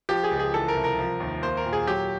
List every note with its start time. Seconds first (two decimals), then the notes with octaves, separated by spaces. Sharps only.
0.09 F3 G4
0.24 G#4
0.31 C#2
0.39 G#4
0.54 E3 A4
0.68 A#4
0.76 C2
0.84 A#4
0.99 F3
1.20 D#2
1.42 A#3 C5
1.57 A#4
1.65 A#2
1.73 G#4
1.87 F#3 G4